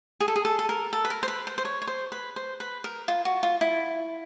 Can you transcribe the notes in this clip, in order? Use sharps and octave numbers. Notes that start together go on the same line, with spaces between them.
G#4
A4
G#4
A4
A4
A#4
A4
B4
A#4
C5
B4
C5
C5
C#5
C#5
C5
B4
C5
B4
A#4
F4
F#4
F4
E4